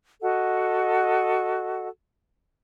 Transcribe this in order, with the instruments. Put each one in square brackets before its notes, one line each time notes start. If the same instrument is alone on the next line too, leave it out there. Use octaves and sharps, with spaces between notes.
[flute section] F#4 A4 D#5 F#5